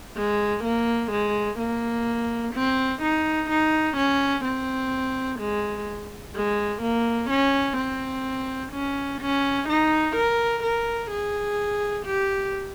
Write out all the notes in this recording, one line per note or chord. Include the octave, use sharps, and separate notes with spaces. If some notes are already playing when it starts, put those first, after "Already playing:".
G#3
A#3
G#3
A#3
C4
D#4
D#4
C#4
C4
G#3
G#3
A#3
C#4
C4
C#4
C#4
D#4
A#4
A#4
G#4
G4